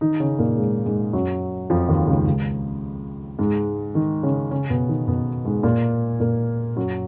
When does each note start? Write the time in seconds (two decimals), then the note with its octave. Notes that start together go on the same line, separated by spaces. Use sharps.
0.01 D#3 D#4
0.20 C#3 C#4
0.39 A#2 A#3
0.57 G#2 G#3
0.85 G#2 G#3
1.13 F#2 F#3
1.70 F2 F3
1.89 D#2 D#3
2.07 C#2 C#3
2.26 C#2 C#3
3.39 G#2 G#3
3.95 D#3 D#4
4.23 C#3 C#4
4.51 C#3 C#4
4.70 B2 B3
4.89 D#3 D#4
5.08 B2 B3
5.45 G#2 G#3
5.63 A#2 A#3
6.20 A#2 A#3
6.76 F#2 F#3